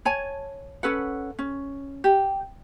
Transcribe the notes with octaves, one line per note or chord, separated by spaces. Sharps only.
C#5 G#5 A5
C#4 A4 B4 F#5
C#4
G4